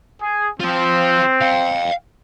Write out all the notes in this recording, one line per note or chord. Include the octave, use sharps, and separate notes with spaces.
G#4
C4 F4 C5
F5 G5